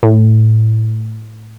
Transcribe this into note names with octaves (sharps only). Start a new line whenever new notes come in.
A2